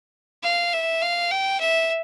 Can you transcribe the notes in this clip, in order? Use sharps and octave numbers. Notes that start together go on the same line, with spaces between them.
F5
E5
F5
G5
E5